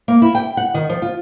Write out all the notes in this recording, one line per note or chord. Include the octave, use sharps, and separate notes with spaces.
A#3
E4
G5
F#5
D#3
F3
F4